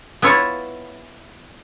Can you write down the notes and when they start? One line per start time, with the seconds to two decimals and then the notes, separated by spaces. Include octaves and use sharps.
0.22 B3 E4 F4 C#5 A5